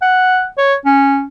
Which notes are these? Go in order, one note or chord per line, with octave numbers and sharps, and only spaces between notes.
F#5
C#5
C#4